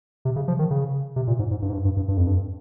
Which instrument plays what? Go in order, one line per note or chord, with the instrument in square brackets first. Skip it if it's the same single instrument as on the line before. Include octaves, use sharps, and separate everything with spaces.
[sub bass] C3
C#3
F3
D#3
C#3
C3
A#2
G#2
G#2
G2
G#2
G2
G2
G2
G2
F2
G2